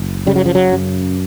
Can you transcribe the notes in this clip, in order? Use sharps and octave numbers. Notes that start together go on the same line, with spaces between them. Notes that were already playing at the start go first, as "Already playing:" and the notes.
Already playing: F#1
C#3 G3
F#3
F3
F#3
F#2